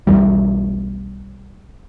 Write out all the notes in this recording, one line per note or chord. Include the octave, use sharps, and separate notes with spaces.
B1 E2 E3 G3